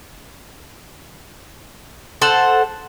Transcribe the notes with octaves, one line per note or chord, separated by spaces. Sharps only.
A4 C5 F#5